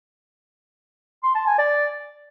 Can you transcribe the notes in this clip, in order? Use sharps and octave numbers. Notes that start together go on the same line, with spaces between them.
C6
A5
G#5
D5